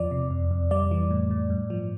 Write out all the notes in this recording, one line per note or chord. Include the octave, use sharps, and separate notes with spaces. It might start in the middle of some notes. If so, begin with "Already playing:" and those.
Already playing: E2 F3 D5
C3
F2
F2
G3 D5
E3
A2
A2
G2
F3